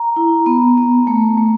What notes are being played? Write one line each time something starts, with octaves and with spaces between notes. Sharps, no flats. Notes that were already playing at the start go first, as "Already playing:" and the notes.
Already playing: A#5
E4
B3
B3
A3
A3